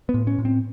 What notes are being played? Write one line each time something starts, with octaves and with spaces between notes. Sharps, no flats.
B3
A2
C#4
A2
C4